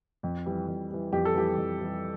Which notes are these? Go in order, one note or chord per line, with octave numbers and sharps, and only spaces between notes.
F2
E3 G3
F2
E3 G3
F2 G4
A4
E3 G3 G4
F2
E3 G3